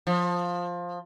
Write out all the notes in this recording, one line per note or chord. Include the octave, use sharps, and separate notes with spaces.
F3